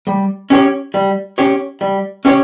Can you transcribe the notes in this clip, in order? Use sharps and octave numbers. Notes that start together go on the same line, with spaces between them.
G3
C#4 G4 C#5
G3
C#4 G4 C#5
G3
C#4 G4 C#5